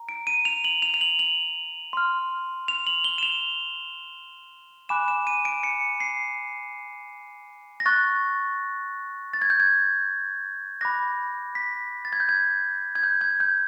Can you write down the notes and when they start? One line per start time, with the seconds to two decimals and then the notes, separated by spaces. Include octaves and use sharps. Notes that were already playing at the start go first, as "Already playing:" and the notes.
Already playing: A#5
0.09 D7
0.27 D#7
0.45 F7
0.64 F#7
0.82 F7
0.94 F7
1.01 F#7
1.19 F#7
1.93 C6 F6
2.68 F7
2.87 F#7
3.04 G7
3.18 E7
3.23 F7
4.89 G#5 B5 D6 F#6 E7
5.08 E7
5.27 D#7
5.45 D7
5.63 C#7
6.00 C7
7.80 A#6
7.86 C#6 F#6 A6
9.33 A6
9.42 G#6
9.50 G6
9.60 G#6
10.81 B5 D6 F#6 A#6
11.55 B6
12.05 A6
12.13 G#6
12.20 G6
12.29 G#6
12.95 G#6
13.03 G6
13.21 G#6
13.40 G6